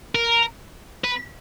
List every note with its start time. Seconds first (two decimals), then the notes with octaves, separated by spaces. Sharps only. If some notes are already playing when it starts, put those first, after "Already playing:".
0.15 A#4
1.04 B4